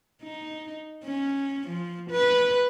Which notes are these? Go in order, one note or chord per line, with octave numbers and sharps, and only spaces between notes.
D#4
C#4
F3
B4